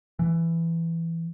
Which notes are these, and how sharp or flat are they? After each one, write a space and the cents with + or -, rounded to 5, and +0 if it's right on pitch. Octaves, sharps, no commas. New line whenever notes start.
E3 +10